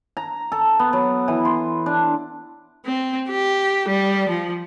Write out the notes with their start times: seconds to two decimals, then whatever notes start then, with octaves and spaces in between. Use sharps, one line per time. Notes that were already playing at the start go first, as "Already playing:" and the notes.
0.17 A#5
0.52 A4
0.79 B3
0.93 F#3
1.28 E3
1.45 C6
1.86 D4
2.85 C4
3.29 G4
3.89 G3
4.29 F3